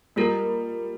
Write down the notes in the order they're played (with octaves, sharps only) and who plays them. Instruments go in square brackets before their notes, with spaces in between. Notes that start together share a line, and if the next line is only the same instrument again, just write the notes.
[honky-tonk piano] G3 [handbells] A#3 F4 A#4